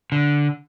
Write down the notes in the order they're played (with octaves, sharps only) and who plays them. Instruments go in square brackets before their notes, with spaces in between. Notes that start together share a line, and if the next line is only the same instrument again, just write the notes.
[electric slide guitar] D3